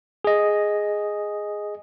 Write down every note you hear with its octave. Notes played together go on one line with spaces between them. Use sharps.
G#4 D#5